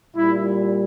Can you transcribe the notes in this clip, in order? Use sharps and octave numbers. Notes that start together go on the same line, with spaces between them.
A#2 G3 E4